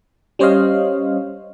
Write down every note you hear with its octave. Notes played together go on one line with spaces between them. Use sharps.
G3 C#4 C5 C#5 D#5 F5